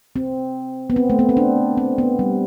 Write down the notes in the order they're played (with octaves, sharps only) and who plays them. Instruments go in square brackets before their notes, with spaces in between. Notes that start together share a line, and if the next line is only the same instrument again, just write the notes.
[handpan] C4
B3
C4
A3
B3
C4
D4
C4
B3
G3